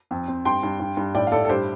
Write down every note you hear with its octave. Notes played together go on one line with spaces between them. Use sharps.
F2
C4
G2 G5 C6
G2
G2
G2
A2 D5 G5
F5
A2 A4 D5
A4
G2 G4 C5